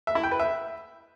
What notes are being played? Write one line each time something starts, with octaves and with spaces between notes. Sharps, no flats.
E5
E4
G5
B4
E5